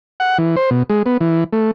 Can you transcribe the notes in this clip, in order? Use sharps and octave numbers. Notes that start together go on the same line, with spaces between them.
F#5
E3
C5
B2
G#3
B3
E3
A3